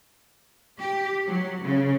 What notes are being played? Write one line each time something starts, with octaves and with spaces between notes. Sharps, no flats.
G4
F#3
C#3